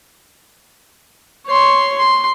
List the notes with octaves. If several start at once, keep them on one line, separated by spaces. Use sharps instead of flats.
C#5 C6
C6